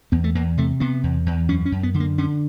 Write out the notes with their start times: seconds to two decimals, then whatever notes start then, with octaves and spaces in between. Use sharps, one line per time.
0.12 E2 B3
0.24 A3
0.35 E2 A#3
0.58 C3 A3
0.80 C3 B3
1.03 E2
1.26 E2
1.49 F#2 C#4
1.65 C#4
1.72 F#2
1.83 B3
1.94 D3
2.00 A#3
2.18 D3 C#4